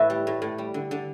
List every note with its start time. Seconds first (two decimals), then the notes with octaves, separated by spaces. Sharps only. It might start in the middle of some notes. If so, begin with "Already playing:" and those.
Already playing: A2 E3 B4 E5
0.10 G3
0.27 A2
0.42 A2
0.58 G3
0.74 D3
0.91 D3